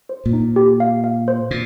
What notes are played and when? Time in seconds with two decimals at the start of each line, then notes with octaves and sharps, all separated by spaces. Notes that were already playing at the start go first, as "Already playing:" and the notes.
0.09 C5
0.26 A#2
0.33 D#4
0.56 G4
0.80 F5
1.04 F5
1.28 C5
1.51 A#2